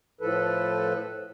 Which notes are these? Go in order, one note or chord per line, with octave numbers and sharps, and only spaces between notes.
A2 F3 A4 B4